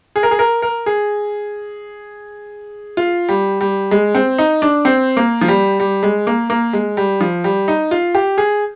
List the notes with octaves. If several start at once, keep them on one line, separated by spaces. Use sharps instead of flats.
G#4
A#4
G#4
A#4
A#4
G#4
F4
G3
G3
G#3
C4
D#4
D4
C4
A#3
F3
G3
G3
G#3
A#3
A#3
G#3
G3
F3
G3
D#4
F4
G4
G#4